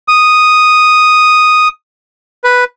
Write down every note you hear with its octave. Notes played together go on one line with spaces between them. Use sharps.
D#6
B4